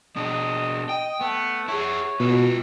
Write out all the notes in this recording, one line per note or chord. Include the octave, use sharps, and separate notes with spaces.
B2 D4 D#5
D#5 G5
A3 B3
E4 G#4 C#5
B2 F4 B4